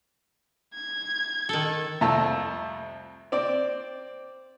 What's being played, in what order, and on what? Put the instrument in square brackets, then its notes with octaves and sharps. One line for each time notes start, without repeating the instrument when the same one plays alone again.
[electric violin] G#6
[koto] D#3 A4
[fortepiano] C2 F2 A3 A5 A#5 E6
C4 D5